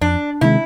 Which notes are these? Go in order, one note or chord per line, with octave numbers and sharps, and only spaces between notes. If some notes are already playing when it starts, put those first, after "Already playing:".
F2 D4
C3 D#3 G#3 E4